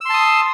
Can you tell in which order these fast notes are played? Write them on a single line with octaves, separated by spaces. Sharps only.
E6 C6 A5 D#6